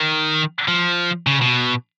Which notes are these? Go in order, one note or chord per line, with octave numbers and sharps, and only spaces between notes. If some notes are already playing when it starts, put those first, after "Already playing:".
Already playing: D#3
F3
C#3
B2